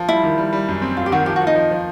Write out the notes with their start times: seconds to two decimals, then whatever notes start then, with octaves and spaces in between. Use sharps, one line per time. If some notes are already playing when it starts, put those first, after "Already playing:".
Already playing: F3
0.09 G3 E4
0.24 D#3
0.38 G3
0.53 G3
0.68 F#2
0.82 C4
0.97 F#2 F4
1.06 G4
1.12 D#3 F#4
1.26 F3 G4
1.36 F#4
1.42 F3
1.47 D#4
1.55 F3
1.71 F3